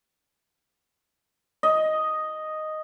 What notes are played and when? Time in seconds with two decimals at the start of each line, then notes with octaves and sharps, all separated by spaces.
1.63 D#5